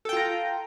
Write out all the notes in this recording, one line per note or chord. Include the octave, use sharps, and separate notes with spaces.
F4 A4 G5 A#5